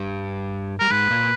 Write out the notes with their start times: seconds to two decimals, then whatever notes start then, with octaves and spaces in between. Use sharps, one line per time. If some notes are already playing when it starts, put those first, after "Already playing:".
Already playing: G2 G3
0.79 G3 A#4
0.90 G#2 G#3 B4
1.10 A#2 A#3